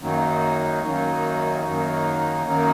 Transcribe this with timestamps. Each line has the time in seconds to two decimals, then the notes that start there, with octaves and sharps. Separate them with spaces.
0.01 F#2 D#3 F#3 A#3 D#4
0.82 F#2 D#3 F#3 A#3 D#4
1.64 F#2 D#3 F#3 A#3 D#4
2.45 F#2 D#3 F#3 A#3 D#4